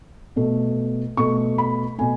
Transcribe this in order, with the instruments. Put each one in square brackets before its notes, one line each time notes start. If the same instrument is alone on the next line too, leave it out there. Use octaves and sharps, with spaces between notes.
[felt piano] B2 A3
B2 A3 C#6
B5
B2 A3 G#5